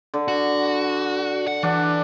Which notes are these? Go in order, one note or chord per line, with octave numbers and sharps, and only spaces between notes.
D3
F#4
F#5
E3 D4 D5 F#5